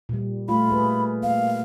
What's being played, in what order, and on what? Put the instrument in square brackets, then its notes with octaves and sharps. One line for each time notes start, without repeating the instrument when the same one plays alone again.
[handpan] A#2 G3
[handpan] A3 F4 [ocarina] B5
[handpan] A#3 G#4 B4
[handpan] A#3 [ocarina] F5